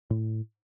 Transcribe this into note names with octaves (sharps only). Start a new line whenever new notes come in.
A2